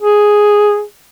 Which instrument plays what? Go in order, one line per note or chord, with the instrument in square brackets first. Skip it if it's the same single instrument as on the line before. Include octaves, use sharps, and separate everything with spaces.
[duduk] G#4